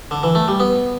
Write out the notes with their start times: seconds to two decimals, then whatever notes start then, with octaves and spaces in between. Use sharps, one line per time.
0.11 D3
0.23 E3
0.35 A3
0.48 G3
0.60 B3